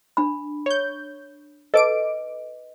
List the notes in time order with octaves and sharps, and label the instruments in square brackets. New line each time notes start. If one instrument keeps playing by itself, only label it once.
[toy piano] D4 B5
[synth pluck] C#5 G6
[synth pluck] A4 D6 D7 [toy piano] B4 D#5